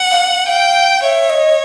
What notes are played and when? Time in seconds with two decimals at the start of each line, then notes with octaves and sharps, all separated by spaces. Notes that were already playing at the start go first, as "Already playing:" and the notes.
Already playing: F#5
0.11 F5
0.48 F5 G5
1.03 C#5 E5
1.30 D#5